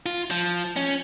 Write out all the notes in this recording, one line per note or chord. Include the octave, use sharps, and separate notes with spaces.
F4
F3
C#4